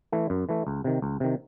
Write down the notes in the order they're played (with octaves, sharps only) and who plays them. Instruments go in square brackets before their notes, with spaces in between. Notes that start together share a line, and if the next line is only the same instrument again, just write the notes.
[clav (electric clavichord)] E3 A3
F#2
E3 A3
C#2
C3 D#3
C#2
C3 D#3